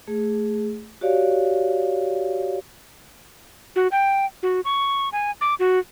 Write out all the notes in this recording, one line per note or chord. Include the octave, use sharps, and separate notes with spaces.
A3 G#4
F#4 G4 C#5 D5 F5
F#4
G5
F#4
C#6
G#5
D6
F#4